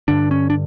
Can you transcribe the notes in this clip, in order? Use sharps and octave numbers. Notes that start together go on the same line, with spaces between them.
G2 D3 D4
C#4
D4